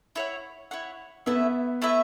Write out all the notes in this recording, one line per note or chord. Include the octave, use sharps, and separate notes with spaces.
E4 C#5 F#5
E4 C#5 F#5
A3 B3 E4 B4 E5
A3 E4 B4 E5